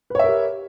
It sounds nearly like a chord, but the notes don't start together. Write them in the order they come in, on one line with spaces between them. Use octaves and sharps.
B4 C#5 E5 A#4 G4